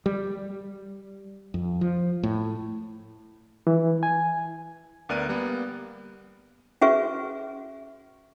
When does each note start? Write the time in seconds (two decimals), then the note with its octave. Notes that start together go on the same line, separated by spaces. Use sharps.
0.06 G3
1.54 F2
1.81 F3
2.23 A2
3.67 E3
4.03 G#5
5.09 D2 B3 A#4 D5 F#6 D#7
5.29 G3 A#3 B3
6.81 C#4 F#4 G#4 B4 E5 C#6